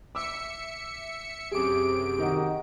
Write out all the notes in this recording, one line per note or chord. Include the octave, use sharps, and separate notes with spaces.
E5 D6 E6 C#7
F#2 C3 G4 G#4 D6 D7
D#3 D#4 F#4